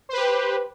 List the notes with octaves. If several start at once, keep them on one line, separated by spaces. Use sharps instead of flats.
G4 B4 C5